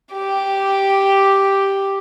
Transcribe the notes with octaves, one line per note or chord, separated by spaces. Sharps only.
G4